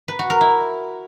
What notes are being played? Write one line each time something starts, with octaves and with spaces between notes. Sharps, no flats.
B4
F#4
A#4
E4